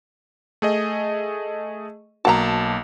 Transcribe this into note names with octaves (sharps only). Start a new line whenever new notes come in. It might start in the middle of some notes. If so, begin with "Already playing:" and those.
A3 G#4 D#5
B1 A#3 F#4 F#5 A5 A#5